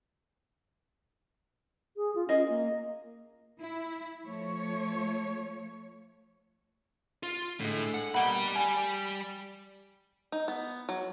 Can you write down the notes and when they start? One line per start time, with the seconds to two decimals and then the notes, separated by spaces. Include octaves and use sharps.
1.97 G#4
2.15 F4
2.29 C#4 G#4 A#4 D#5
2.49 A#3
3.61 E4
4.25 F3 A3 C#5
7.23 F4
7.60 A2 D3 G#3
7.94 F#5
8.14 B2 G3 A#3 F#5 B5
8.55 G#5
10.32 D#4
10.48 B3
10.89 F#3